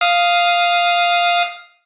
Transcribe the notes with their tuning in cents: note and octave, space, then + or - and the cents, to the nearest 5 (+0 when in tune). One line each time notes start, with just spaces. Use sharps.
F5 +0 D#6 +0